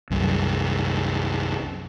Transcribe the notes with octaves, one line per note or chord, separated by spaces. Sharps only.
C2 F#2